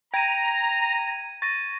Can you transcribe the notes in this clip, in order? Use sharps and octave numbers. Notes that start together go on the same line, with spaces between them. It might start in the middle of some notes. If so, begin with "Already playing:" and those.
G5 A#5 G#6 D#7
C#6 A6 A#6 D#7